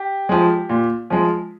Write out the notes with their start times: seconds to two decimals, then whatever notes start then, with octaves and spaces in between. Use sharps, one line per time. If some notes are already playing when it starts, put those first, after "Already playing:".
Already playing: G4
0.29 F3 G#3
0.69 A#2
1.10 F3 G#3